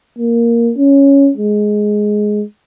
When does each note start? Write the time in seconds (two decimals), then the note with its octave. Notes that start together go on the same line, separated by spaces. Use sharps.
0.19 A#3
0.78 C#4
1.37 G#3